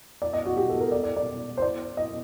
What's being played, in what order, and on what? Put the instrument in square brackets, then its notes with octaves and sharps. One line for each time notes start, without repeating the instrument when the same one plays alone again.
[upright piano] D5
D#5
F#4
G4
A4
A#4
D5
D5
D5
C5
D5
D#5